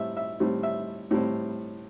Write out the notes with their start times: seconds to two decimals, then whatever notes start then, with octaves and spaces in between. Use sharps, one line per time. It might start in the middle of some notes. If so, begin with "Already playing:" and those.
Already playing: A2 G3 C4 E5
0.17 E5
0.40 A2 G3 C4
0.63 E5
1.11 A2 G3 C4